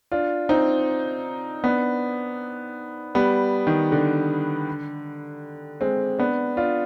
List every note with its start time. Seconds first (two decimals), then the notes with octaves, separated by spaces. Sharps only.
0.11 D4 F4
0.49 C4 D#4
1.64 B3 D4
3.15 G3 B3
3.67 D#3
3.92 D3
5.81 G#3 C4
6.19 B3 D4
6.57 D4 F4